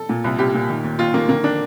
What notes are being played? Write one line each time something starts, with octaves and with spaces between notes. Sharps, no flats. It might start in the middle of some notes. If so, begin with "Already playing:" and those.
Already playing: A4
A#2
C2
C2 G4
A#2
D#3
D#2
D#2 F4
D#3 A#3
D3 A#3
D4